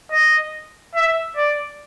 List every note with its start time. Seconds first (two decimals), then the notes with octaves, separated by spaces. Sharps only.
0.11 D#5
0.95 E5
1.36 D5